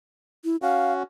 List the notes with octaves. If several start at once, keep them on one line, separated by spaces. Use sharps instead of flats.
E4
C#4 F#4 F5